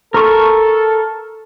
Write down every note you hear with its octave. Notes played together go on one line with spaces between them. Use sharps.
A4 A#4 C#6